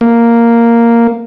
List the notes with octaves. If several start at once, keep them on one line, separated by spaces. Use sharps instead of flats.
A#3